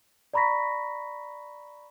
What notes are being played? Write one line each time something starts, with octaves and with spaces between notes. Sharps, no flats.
D5 A#5 B5 C#6 A#6 B6